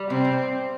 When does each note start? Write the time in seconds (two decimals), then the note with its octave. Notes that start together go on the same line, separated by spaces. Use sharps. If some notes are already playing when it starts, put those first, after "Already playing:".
Already playing: G3
0.10 C3 C4
0.25 C3